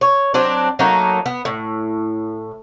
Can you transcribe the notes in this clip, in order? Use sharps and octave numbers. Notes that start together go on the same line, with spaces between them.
C#5
F#3 C4 D4
F#3 A3 A#3 D#4
B3
A2